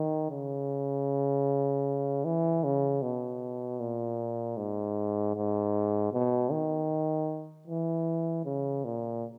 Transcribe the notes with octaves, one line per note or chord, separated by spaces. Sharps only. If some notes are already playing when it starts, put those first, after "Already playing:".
Already playing: D#3
C#3
E3
C#3
B2
A#2
G#2
G#2
B2
D#3
E3
C#3
A#2